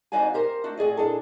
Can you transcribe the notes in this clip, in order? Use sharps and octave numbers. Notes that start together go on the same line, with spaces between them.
F2 D#4 F#4 D5 F5 G#5
G4 A#4 C5
A3 D4 F#4
A2 G#4 D5 D#5
A#2 D4 G#4 A4